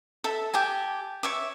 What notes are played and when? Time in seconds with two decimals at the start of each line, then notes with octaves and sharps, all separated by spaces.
0.24 A4 E5
0.54 G4 G#5 A5
1.23 C#5 E5 D6